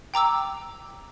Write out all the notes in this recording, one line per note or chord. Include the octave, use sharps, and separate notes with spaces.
G5 A#5 D6 E6